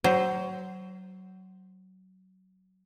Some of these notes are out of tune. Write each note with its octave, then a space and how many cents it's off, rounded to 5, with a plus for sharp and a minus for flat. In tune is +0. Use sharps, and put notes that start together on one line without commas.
F#3 +20 C5 +0